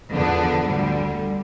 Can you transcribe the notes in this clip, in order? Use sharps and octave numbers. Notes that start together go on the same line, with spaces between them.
E2 D3 F3 B3 D4
D2 D3 G3